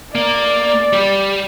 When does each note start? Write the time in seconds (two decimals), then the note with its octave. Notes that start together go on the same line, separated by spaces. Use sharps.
0.15 A#3 D5
0.93 G3 G4